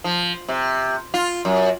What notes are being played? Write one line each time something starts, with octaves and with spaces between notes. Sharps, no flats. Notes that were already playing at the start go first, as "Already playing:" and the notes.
F3
C3
F4
F#2